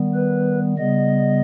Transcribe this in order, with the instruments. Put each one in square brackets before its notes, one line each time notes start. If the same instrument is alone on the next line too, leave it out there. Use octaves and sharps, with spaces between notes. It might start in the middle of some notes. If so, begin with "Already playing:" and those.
Already playing: [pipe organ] D#3 G3 B3
B4
C#3 G3 B3 D#5